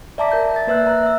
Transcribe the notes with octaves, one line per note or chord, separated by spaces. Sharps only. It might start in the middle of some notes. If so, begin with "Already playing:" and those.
D5 E5 A5 A#5 D6 B6
A#4 E5 G6
D5 A6
A#3 B4 E5 E6 F#6
A#5 F#6
E5 E6